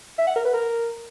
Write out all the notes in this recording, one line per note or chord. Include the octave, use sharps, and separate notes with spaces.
E5
F#5
A#4
B4
A#4